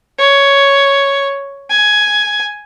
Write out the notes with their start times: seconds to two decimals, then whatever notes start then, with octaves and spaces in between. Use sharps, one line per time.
0.18 C#5
1.70 G#5